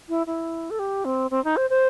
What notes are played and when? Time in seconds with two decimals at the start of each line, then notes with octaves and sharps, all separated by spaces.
0.09 E4
0.26 E4
0.70 A4
0.79 G4
1.05 C4
1.31 C4
1.44 D#4
1.57 C5
1.70 C5